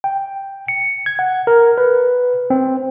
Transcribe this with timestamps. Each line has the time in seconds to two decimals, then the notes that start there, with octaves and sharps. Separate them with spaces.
0.04 G5
0.68 C#7
1.06 G#6
1.19 F#5
1.47 A#4
1.78 B4
2.50 C4